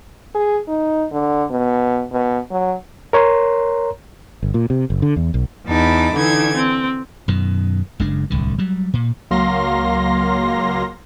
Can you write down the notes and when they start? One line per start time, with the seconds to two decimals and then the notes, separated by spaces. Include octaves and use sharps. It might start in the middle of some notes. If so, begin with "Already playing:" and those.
0.35 G#4
0.68 D#4
1.12 D3
1.51 B2
2.12 B2
2.51 F#3
3.13 A#4 C#5 A#5 C6
4.43 G1
4.54 A#2
4.70 C3
4.90 F#1
5.02 D3
5.16 E2
5.34 B1
5.67 E2 D#4 A5 B5 D6
6.14 D3 E3 D#4 G#6
6.56 C4
7.28 F#2 B2 D#3
8.00 F#1 C#3 G#3 D4
8.30 D1 C2 D3
8.59 F#3 G3
8.94 A#2
9.30 C#2 F#3 A#3 F5 C6 A#6